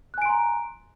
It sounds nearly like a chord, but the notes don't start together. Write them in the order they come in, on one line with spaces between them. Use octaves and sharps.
F#6 G#5 D7 C6 A#5